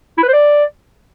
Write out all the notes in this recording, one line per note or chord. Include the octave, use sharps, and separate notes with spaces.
E4
B4
C5
D5